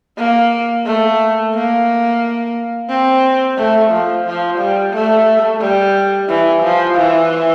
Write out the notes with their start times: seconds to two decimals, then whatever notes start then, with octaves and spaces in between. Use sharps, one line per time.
0.18 A#3
0.86 A3
1.54 A#3
2.89 C4
3.58 A3
3.91 F3
4.26 F3
4.58 G3
4.93 A3
5.61 G3
6.29 E3
6.63 F3
6.97 E3